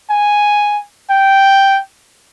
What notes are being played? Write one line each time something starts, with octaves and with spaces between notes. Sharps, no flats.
G#5
G5